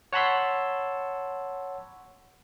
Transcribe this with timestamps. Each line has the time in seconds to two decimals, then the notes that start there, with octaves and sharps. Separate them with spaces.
0.13 C#5 F#5 A5 B5 C6 E6